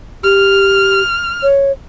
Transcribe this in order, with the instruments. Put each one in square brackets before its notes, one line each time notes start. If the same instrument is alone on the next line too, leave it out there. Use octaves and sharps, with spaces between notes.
[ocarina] G4 [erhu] F6
[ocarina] C#5